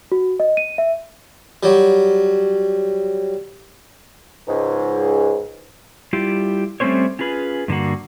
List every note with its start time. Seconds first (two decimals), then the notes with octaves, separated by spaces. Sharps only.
0.12 F#4
0.40 D#5
0.57 D#7
0.78 E5
1.63 F#3 G3
4.48 C#2 G#2
6.13 G3 E4 F4 G4
6.80 G3 A3 C4 C#4 C5 C#5
7.19 C#4 F4 G#4 B4
7.68 G2 D3 A#3 F#4